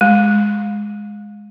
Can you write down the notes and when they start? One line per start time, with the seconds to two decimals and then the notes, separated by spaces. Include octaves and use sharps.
0.01 G#3